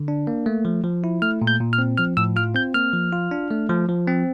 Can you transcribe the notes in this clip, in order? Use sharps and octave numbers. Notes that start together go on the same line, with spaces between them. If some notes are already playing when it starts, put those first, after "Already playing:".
Already playing: D3
D4
A#3
A3
F3
F3
E4
A3 F6
A#2
G6
A#2
F6
C4
F3 F6
A2 E6
F4 F6
C4 G6
A#3 F6
F3
F4
D4
A3
F3
F3
C4